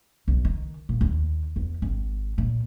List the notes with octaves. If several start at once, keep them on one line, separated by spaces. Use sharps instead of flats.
B1
D#3
A#2
D#2
E2
G#1
A#2